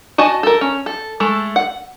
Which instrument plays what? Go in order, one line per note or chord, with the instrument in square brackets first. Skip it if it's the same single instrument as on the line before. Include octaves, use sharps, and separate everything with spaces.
[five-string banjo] F#4 D#5 G#5 A5
A4 A#4
C#4
A4
G#3 A3 A4
F#5